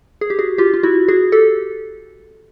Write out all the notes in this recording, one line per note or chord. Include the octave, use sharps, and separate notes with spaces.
G#4
G4
F#4 G#4
F4 G4
F4
E4 F#4
F#4 G#4
G4 A4